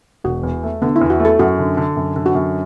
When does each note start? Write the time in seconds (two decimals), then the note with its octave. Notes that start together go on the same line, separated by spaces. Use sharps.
0.24 E1 F#4
0.43 E2
0.63 A3
0.82 D3 B3
0.96 E4
1.01 E2
1.10 F#4
1.20 A3
1.25 A4
1.39 F#2 F#4
1.59 D3
1.77 D3
1.96 F#2
2.16 D3
2.26 F#4
2.35 F#2